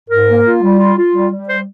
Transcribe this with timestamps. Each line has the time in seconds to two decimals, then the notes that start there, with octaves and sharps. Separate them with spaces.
0.09 G#2 A#4
0.28 A#3
0.45 F4
0.62 G3
0.79 F4
0.98 F4
1.15 G3
1.32 G3
1.49 C5